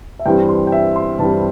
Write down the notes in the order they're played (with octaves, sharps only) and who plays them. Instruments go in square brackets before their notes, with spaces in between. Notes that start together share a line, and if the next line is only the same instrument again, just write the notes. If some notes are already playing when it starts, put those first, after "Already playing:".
[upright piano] E5
G2 E3 G3 C4 G5
C6
G5
E5
C6
G2 E3 G3 C4 A5